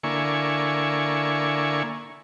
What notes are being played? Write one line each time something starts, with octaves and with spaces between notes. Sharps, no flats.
D3 A#3 E4 G#5 C#6